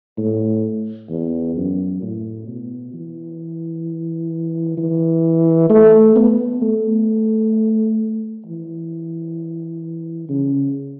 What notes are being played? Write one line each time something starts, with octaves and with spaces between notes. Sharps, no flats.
A2
E2
F#2
A2
B2
E3
E3
A3
B3
A3
E3
C#3